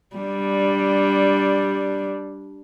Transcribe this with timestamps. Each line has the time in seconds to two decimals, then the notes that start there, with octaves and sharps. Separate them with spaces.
0.16 G3 D4